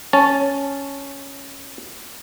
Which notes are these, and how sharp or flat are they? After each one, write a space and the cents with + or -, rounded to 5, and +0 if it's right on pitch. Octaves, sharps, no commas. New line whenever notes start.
C#4 +0 A5 -5